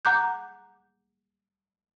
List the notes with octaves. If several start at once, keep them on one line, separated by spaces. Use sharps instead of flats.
F#5 A#5 D6 F#6 G6